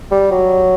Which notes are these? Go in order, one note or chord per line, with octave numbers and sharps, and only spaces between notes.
G3
F#3